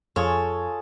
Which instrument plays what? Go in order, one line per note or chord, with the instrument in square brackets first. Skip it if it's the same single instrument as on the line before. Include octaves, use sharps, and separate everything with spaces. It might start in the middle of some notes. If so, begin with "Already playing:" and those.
[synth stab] F2 [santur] F4 G#4 C#6 [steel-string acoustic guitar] A4 [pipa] C#5